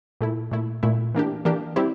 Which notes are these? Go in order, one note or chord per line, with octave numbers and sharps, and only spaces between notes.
A#2 A3 E4
A#2 A3 E4
A#2 A3 E4
E3 A#3 D4 G4
E3 A#3 D4 G4
G3 C4 E4 G4